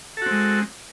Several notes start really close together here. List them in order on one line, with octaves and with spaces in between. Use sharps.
A4 F#4 C4 G#3